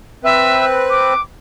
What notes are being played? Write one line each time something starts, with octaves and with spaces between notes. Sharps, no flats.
C4 B4 E5
D6